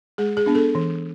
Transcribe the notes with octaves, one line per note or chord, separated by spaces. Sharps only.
G#3 G#4
G#4
B3 D4
A4
E3